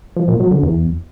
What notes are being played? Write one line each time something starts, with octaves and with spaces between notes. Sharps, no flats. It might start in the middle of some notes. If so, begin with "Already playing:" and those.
F3
A#2
F#3
D3
E2